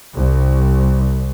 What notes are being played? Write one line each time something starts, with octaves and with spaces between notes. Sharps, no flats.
C2